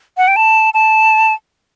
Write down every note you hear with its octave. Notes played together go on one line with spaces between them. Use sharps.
F#5
G5
A5
A5